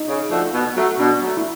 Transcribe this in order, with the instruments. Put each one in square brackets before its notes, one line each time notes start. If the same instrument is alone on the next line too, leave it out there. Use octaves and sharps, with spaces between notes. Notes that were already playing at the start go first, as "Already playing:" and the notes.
Already playing: [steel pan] D#4
[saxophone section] C#3
F3 A3 D4 F#4
B2
F#3 A3
[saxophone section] B2 [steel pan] D4
[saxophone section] F#3 A3
[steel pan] E4